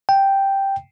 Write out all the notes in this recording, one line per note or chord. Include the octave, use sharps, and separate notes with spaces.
G5